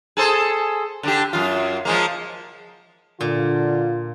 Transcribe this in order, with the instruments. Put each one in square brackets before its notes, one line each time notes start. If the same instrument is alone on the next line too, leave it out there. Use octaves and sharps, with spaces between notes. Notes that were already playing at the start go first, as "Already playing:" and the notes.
[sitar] G#4 A4 C5
D3 D4 G4
F#2 F4
F3 G#3 A#3
[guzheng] A#2 [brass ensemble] D3 [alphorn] F4